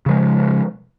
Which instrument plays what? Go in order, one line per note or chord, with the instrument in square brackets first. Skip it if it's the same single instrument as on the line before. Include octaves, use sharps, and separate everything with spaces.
[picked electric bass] C#3 F3 G#3